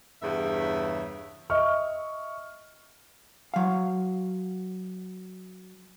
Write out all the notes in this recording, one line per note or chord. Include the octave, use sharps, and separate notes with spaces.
E2 G2 C#3 E5
D#5 E5 C#6 F6
F#3 F5